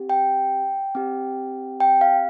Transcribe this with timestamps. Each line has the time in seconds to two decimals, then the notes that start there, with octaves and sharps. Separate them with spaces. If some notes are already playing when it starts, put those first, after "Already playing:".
Already playing: C4 G4
0.10 G5
0.95 C4 G4
1.80 G5
2.01 F5